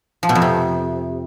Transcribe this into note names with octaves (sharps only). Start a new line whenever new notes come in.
F3
B2
F2
C3